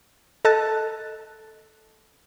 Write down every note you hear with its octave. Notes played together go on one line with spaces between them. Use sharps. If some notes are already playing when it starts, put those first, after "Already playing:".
A4 D#5 A5 F#6 A6